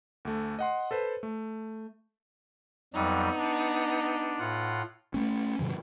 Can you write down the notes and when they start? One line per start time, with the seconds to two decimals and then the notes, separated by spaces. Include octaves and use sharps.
0.25 D2 A3
0.59 D#5 F#5 C6
0.91 A4 B4 C5
1.23 A3
2.94 F2 F#3 G3 B3 D#4
3.38 D4
4.39 A2 F4 F#5
5.14 A3 C#4
5.59 G2 B2 D3 F3